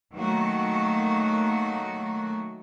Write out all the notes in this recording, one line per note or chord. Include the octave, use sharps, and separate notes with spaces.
D#3 F#3 A3 A#3 F#4